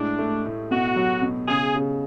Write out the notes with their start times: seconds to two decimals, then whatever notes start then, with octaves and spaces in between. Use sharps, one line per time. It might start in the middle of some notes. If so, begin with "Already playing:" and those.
Already playing: A2 G#3 D4
0.18 A3
0.45 A2
0.71 B2 F#4
0.96 F#3
1.22 B2
1.48 C#3 G#4
1.75 C#3